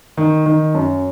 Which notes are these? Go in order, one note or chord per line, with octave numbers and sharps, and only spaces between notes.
D#3
D#3
F#2